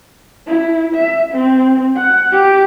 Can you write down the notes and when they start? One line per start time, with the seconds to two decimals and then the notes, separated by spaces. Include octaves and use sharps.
0.47 E4
0.95 E5
1.32 C4
1.96 F#5
2.32 G4